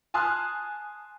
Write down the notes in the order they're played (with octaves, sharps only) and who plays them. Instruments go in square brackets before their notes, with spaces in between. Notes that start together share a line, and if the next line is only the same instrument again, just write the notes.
[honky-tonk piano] G#5 A5 C6 D#6 F6 F#6